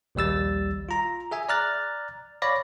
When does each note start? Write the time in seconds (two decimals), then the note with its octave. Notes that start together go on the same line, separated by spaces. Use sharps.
0.15 A#1 D#2 G3 E6 A6
0.89 F4 A#5
1.31 G#4 E5 G#5
1.49 D5 A#5 F6 F#6 A6
2.42 C#5 D5 F5 B5 A#6